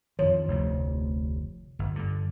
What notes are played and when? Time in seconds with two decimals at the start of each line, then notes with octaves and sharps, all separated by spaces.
0.19 F2 D#3 F3 C#5
0.48 F1 D2 C3
1.79 G1
1.96 G2 D3